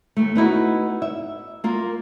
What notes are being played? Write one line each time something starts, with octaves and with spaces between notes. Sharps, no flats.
D#2 A3
B3 D#4 E4 F#4
E5
A#3 F4 A#4